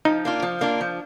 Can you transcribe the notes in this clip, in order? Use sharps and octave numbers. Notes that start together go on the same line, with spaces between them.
F3 D#4
A#3 D4 F4
F3
A#3 D4 F4
F3